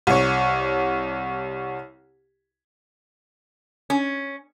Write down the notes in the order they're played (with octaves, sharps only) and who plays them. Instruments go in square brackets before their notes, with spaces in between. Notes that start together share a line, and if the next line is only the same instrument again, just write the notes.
[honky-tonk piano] C2 C#5
[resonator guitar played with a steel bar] C#4